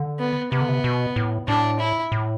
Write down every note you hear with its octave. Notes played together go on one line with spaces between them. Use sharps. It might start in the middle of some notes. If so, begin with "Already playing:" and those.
Already playing: D3
B3
C3 B3
D3
C3
B2
A2
A2 D4
E4
A2